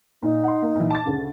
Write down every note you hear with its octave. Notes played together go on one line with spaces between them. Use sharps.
A#2 D#4
F#5 C6
A#3
A#2 E3
A5 D6 A6
D2 C#3